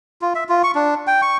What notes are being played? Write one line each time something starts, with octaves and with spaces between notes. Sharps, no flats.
F4
E5
F4
C#6
D4
G5
C#6